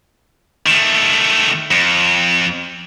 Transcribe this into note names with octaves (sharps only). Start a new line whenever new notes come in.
D#3 A3
F2